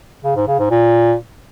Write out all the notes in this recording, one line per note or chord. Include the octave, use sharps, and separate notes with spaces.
C#3
G#2
C#3
G#2
A#2